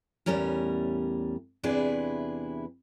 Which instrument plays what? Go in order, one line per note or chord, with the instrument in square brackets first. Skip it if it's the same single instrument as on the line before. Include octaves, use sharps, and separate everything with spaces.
[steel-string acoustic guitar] E2 A2 G3 C#4 A#4
E2 C3 D4 E4 G#4 B4